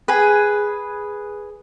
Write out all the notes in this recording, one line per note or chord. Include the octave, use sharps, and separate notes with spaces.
G#4 B4